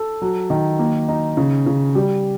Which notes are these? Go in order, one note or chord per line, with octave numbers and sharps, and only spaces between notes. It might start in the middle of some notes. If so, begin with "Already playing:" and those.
Already playing: A4
F#3
D#3
A#3
D#4
C#3
C#3
G3